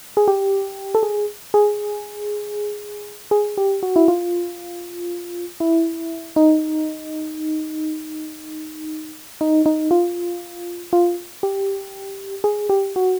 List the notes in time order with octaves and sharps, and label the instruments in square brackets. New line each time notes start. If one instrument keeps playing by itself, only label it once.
[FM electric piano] G#4
G4
A4
G#4
G#4
G#4
G4
F#4
E4
F4
E4
D#4
D#4
D#4
F4
F4
G4
G#4
G4
F#4